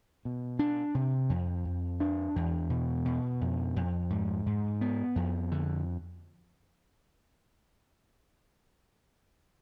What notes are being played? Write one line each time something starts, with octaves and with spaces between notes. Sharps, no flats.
B2
D4
C3
F2
F2
D4
E2
B2
B2
F2
F2
G#2
G#2
B3
F2
D3